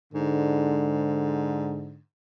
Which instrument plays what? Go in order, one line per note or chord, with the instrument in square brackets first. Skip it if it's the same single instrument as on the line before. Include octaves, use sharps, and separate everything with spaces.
[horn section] G#2 D3